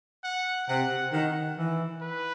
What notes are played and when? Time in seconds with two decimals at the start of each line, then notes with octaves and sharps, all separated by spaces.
0.24 F#5
0.68 C3 F#5
1.13 D#3 F#5
1.57 E3
2.01 B4